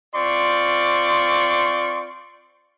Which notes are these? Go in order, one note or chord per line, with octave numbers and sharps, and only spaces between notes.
C4 F4 D5 C6 C#6